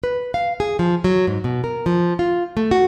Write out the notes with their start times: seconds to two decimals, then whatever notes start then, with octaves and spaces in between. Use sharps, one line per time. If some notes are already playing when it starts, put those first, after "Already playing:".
0.04 B4
0.34 F5
0.60 G#4
0.79 F3
1.04 F#3
1.27 G#2
1.44 B2
1.64 A#4
1.86 F3
2.19 F4
2.57 A3
2.71 F#4